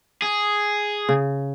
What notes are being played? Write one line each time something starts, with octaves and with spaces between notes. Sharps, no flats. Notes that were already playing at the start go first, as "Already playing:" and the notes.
G#4
C#3